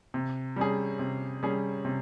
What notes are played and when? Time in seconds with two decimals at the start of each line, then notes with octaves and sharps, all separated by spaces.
0.14 C3
0.56 G3 C#4 G#4
0.99 C3
1.43 G3 C#4 G#4
1.85 C3